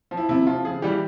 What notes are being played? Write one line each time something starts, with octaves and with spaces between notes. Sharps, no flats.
F3
E4
C3 E4
F3 F4
C#3 G#4
E3 G3 G4